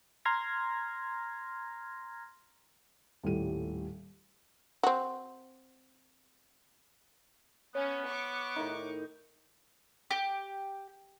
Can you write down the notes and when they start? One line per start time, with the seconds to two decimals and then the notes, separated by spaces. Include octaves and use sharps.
0.25 A#5 C6 F6 G#6 A#6
3.24 D#1 A2 G3 G4 D#7
4.83 C4 F#4
7.75 B3 C#4 C#5
8.07 C#6 D6
8.56 A2 D#3 D#4
10.11 G4